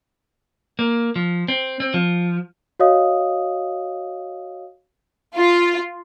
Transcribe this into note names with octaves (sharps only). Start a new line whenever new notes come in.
A#3
F3
C4
C4
F3
F#4 C#5 D#5 F5 D#6
F4